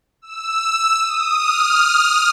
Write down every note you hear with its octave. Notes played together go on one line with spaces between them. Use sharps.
E6
D#6
F6